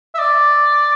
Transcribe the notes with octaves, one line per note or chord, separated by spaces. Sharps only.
E5
D5